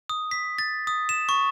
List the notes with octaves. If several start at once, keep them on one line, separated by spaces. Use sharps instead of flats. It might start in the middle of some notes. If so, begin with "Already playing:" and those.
D#6
B6
A6
D#6
E7
C#6